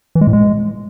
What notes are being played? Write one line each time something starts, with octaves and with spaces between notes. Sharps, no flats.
E3
G#3
A2
G#3